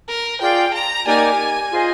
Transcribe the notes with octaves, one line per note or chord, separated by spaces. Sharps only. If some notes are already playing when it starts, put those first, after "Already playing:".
A#4
F4 G#4 D5 F5 G5
A#5
A#3 D#4 G4 A#4 D5 G#5
F4 G#4 C5 D#5